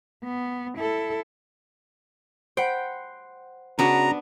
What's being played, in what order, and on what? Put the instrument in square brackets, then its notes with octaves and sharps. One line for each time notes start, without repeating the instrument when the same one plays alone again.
[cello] B3
E4 A4
[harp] C5 F#5 B5 [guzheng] G5
[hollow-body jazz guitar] C#3 F#4 [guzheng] B3 D4 [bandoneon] A#5